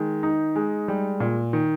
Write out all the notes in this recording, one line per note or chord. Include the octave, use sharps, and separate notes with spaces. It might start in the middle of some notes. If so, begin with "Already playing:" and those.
Already playing: D#3 G#3
D#4
G#3
G3
A#2
D#3